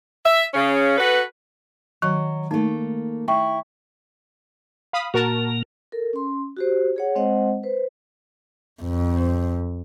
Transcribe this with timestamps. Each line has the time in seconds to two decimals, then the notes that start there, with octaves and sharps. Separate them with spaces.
0.24 E5
0.53 C#3 C#4
0.98 F#4 A4 B4
2.02 D#3 F#3 C#6
2.51 A3 A#3 D#4
3.28 E4 E5 G5 C#6
4.93 F5 B5 D#6
5.14 A#2 A#3 F#4 A#4 A5
5.92 A4 A#4
6.13 C#4 C6
6.57 F#4 G4 C5
6.96 G#4 C#5 F#5
7.15 G#3 C4 C5 D#5 F#5
7.63 B4 C5
8.82 F2